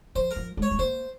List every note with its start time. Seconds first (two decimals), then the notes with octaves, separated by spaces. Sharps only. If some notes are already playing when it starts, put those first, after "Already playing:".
0.15 F3 C5
0.31 A#4
0.36 F3
0.57 G#3
0.62 C#5
0.71 G#3
0.79 A#3 C5